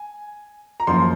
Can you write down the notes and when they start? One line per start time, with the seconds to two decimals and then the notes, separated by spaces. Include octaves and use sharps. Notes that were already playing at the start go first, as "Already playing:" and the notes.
Already playing: G#5
0.80 A#5
0.87 F#2 F3 A#3 C6